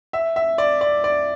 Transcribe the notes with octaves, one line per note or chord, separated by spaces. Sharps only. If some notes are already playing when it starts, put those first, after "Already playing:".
E5
E5
D5
D5
D5